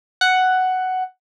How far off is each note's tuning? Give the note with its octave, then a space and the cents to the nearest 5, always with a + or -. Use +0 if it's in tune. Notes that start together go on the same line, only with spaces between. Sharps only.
F#5 +5